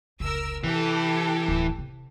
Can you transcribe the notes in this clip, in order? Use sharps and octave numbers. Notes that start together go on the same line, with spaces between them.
F1 C#2 A#4 E6
C3 E3 G4 A4
D1 F#2
C3